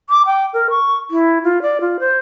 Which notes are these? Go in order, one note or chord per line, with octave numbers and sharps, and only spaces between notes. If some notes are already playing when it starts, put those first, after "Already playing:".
D6
G5
A#4
C#6
E4
F4
D5
F4
C5